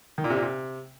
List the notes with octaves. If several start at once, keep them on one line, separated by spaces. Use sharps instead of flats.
D#3
A#2
C3
A#2
C3